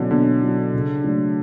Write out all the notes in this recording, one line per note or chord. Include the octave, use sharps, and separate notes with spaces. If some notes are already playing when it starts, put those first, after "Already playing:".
Already playing: B2 D3 F#3 C#4 E4
B2 D3
F#3 C#4 E4
C#3
F#3 A3 D4